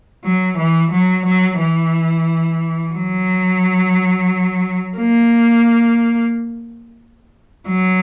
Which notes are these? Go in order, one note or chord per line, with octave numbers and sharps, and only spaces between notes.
F#3
E3
F#3
F#3
E3
F#3
A#3
F#3